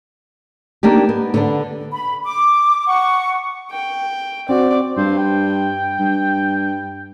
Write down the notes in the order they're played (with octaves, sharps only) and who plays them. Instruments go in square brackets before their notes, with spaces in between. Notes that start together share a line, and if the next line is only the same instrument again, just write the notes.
[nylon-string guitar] A#3 D4 D#4 G4
B3
D3 B3 D4
[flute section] B5
D6
F#5 C#6
[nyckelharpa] G5
[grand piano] C4 F#4 [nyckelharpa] D5
[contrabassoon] G2 [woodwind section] C4 F4 C5
[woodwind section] G5
[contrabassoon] G2